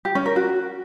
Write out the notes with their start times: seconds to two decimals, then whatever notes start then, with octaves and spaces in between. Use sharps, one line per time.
0.05 G4
0.15 C#4
0.26 A#4
0.36 F#4